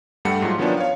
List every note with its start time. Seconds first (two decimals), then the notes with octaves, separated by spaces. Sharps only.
0.25 G2 G3 A3 G4 F#5 C#7
0.42 G#2 F3 F#3 C6
0.58 D#3 F3 F#3 B3 C#4 D4
0.77 C#5 F5